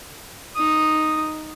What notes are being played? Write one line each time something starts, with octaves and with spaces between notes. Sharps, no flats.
D#4 D#6